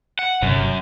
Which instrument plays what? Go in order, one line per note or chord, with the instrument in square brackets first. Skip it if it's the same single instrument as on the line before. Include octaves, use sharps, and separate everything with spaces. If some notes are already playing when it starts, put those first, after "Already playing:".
[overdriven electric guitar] F#5
[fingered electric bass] G1 C3 [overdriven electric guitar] F#2